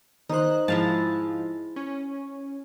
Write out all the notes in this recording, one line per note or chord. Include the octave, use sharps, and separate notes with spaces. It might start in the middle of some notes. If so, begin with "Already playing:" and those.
D#3 D#4 C5 F#6
G#2 F3 G#3 E4 F5 A5
C#4